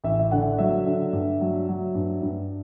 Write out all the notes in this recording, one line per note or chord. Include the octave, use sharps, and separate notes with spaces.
A1 E5
E5
D3 F#5
F#3 E5
D3
G2
F#3
F#3
G2
G2